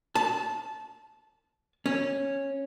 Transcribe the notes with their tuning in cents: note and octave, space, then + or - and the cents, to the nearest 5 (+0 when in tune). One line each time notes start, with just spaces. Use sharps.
A5 -20
C#4 -10